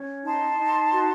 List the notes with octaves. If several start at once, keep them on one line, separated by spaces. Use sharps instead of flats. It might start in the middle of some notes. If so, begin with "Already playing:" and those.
Already playing: C#4
D#4 A5 C6
D#4
F#4